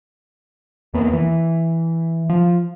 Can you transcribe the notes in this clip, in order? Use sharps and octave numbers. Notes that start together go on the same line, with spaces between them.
E2 A#3 B3
E3
F3